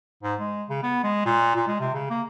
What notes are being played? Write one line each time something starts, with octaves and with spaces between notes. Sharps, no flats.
G#2
G#3
C#3
B3
G#3
A#2
A#2
G#3
C3
C#3
A#3